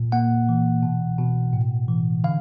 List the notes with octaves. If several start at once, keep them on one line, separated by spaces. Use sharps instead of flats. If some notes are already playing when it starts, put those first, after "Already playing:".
Already playing: A#2
A#3 F#5
E3
B2
B2
A2
E3
D3 F5